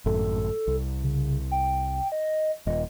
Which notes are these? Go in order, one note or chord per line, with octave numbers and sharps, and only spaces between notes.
G#1 F#2 A2 A4
C2
C#3
G5
D#5
D#1 D#5